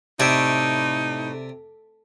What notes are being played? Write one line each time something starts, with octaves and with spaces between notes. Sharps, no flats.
A2 C3 D#4 D5 E5